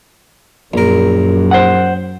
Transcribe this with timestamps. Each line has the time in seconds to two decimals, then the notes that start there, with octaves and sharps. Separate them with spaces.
0.74 A#1 F#2 A#4
1.51 C5 F#5